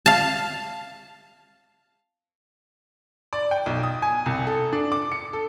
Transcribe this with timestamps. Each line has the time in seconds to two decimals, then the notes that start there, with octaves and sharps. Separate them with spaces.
0.06 F5 A5
3.33 D5
3.51 G5
3.66 B1
3.83 D#6
4.02 G#5
4.26 C2
4.47 A4
4.73 D4
4.92 D6
5.12 C#7
5.33 A4